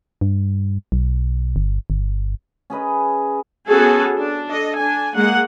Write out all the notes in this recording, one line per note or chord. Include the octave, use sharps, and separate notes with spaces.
G2
B1
G1
G1
C#4 G#4 B4 D#5
B3 C#4 F#4 G#4 A4
D4
A4 D#5
D4 G#5
G#3 A#3 F#5